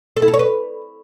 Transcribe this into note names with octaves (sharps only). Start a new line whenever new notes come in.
A4
E4
A4
C#5
B4